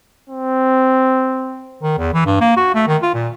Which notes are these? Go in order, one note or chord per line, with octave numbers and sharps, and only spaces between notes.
C4
D#3
E2
E3
G2
A#3
F#4
A3
D#3
F4
A#2